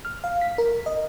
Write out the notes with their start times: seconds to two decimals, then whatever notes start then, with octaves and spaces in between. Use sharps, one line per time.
0.05 F6
0.24 F5
0.41 B6
0.58 A#4
0.86 D#5